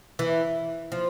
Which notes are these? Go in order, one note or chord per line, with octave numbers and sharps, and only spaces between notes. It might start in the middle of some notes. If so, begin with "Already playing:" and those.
E3
F3